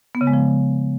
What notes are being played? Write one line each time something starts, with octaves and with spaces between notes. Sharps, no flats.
B3
C#3
G#3
F3